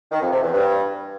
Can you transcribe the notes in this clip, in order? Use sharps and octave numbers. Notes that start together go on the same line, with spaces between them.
D#3
F2
C3
E2
G2